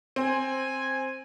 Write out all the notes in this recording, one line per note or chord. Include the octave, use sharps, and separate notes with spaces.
C4 G#5